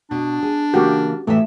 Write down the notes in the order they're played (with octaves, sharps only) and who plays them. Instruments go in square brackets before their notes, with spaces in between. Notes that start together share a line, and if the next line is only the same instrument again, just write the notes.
[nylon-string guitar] B2 [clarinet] D4
[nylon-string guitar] G#4
[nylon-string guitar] C#3 E3 A#3 [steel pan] F#4 G4
[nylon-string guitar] A2 E4 E5 [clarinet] E3 [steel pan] A3